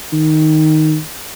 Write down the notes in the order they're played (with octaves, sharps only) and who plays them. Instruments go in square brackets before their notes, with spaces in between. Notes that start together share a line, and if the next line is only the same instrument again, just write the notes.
[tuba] D#3